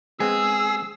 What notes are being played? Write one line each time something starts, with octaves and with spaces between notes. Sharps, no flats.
G#3 B3 C4 G#4 E6